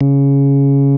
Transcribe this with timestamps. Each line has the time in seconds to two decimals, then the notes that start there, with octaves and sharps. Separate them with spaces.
0.01 C#3